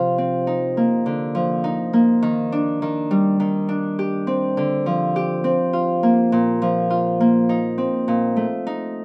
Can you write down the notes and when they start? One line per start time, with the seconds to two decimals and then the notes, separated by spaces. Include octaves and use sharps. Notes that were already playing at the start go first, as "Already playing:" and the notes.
Already playing: C3 F3 F4
0.18 C4
0.47 D#4
0.77 A#3
1.06 D3
1.35 F3
1.64 D#4
1.93 A#3
2.23 D#3
2.52 D4
2.82 D#3
3.11 G3
3.40 D#3
3.69 D4
3.99 G4
4.27 C4
4.57 D3
4.86 F3
5.16 G4
5.44 C4
5.73 F4
6.03 A#3
6.32 A#2
6.62 F3
6.90 F4
7.20 A#3
7.49 D#4
7.78 C4
8.08 A#2
8.36 A3
8.67 D#4